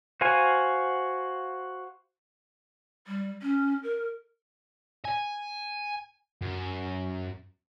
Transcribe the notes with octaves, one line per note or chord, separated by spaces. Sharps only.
F#4 C5 F5 F#5 G#5
G3
C#4
A#4
G#5
F#2